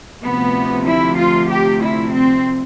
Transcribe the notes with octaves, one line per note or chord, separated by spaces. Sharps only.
D2 C3 F3 B3
E4
F4
G4
E4
C4